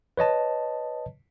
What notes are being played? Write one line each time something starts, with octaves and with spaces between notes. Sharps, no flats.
B4 C#5 D#5 A5